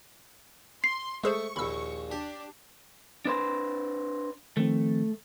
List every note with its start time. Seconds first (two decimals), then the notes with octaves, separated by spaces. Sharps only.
0.84 C6 C7
1.24 G#3 A3 G#4 C5 C#6
1.56 A#1 D#2 B5 E6
2.12 D4 G4
3.25 D4 B4 C5
4.57 D#3 F3 A3 C4